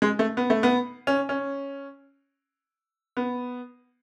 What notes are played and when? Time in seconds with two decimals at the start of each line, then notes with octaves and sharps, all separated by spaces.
0.02 G#3
0.19 A3
0.37 B3
0.50 A3
0.63 B3
1.07 C#4
1.29 C#4
3.17 B3